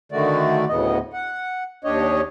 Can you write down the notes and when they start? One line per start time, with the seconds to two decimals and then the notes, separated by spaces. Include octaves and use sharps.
0.12 D3 D#3 A3 F#4 D5
0.69 D2 A2 C#3 B3 D#5
1.13 F#5
1.84 D#2 D4 G4 C#5 D#5